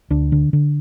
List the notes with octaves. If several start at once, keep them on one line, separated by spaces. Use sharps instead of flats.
D2 D4
D3
D3